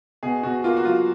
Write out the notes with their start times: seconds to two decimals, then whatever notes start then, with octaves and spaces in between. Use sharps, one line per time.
0.23 B2 G#4
0.43 B2 F#4
0.64 A#3 F4
0.76 F#4
0.85 F#3 F4